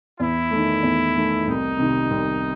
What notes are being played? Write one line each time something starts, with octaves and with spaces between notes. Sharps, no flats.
E2 E4
A3
D#3
E2
D#3 A3
C2 D#4
C3 D#3
C2